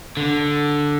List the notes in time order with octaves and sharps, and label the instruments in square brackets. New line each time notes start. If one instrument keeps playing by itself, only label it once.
[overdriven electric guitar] D3